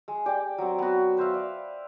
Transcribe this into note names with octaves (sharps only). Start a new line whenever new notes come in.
G#3
G4 D5 G5
F#3 C4
B3 F#4
B4 C5 E5 F5
D5